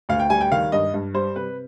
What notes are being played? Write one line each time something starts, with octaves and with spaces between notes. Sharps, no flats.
D2 F5
G5
G3 G#5
G5
D#3 F5
G2 D#5
G2
G3 C5
C3 B4